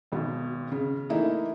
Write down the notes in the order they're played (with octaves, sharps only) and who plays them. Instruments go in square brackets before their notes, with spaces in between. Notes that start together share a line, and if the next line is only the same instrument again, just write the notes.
[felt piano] G#1 B2
C#3
E3 A3 A#3 D#4 E4